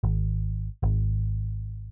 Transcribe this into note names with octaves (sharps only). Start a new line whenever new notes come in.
G#1
G#1